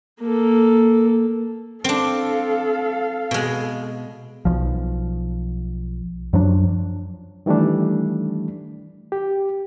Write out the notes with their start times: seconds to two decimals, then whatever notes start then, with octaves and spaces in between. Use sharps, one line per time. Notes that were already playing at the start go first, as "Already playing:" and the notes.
0.21 A#3 A4
1.84 C4 D4 A4 F5
3.31 B2 G#3
4.45 B1 F3
6.33 F#2 F3 F#3 D4
7.46 D#3 E3 G3 A3 D4
9.12 G4